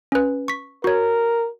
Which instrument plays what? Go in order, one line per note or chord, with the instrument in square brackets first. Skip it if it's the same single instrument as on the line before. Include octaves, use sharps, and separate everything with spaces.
[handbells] C#4 B4
C#6 B6
[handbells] F#4 C#5 [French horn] A#4